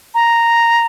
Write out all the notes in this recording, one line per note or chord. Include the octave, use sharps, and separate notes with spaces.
A#5